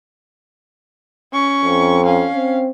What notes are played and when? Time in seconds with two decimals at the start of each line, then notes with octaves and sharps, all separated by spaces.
1.32 C#4 C#6
1.64 F2
2.05 C#4 F5
2.35 C4